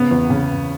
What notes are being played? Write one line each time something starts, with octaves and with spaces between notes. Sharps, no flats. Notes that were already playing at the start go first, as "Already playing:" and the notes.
Already playing: C#3 B3
E2
C#3